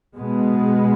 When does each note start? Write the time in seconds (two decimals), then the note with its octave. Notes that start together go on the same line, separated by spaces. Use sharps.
0.16 B2 G#3 B3